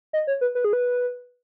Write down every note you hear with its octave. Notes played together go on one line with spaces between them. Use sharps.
D#5
C#5
B4
B4
G#4
B4